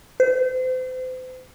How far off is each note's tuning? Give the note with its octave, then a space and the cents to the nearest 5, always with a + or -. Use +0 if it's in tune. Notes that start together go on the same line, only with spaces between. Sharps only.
C5 -35